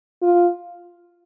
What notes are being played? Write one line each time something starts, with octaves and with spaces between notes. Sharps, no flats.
F4